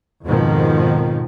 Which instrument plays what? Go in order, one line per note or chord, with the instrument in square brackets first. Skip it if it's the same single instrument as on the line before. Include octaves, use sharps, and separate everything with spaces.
[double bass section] F2 G#2 B2 D#3 F3